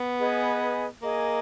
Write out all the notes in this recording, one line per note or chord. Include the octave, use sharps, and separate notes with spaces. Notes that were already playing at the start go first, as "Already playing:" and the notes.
Already playing: B3
G#4 B4 D#5 G#5
A#3 G#4 D#5 G#5